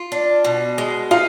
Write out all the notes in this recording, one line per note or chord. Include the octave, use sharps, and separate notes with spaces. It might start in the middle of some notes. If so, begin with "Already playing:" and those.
Already playing: F4
D4
B2
G#3
D#4 F4 F5